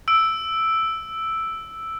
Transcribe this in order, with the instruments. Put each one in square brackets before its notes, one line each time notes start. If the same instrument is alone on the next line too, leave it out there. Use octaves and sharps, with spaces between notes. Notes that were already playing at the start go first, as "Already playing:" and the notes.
[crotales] E6 D7